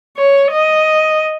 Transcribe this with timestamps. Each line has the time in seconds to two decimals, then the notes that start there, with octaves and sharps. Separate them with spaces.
0.17 C#5
0.52 D#5